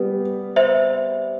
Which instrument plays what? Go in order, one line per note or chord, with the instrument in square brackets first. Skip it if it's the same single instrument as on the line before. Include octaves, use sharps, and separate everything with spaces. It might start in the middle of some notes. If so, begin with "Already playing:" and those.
Already playing: [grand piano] G3 B3 [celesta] B4
[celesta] C5 E5